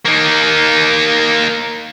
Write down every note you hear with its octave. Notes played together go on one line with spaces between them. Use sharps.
A#3 D#4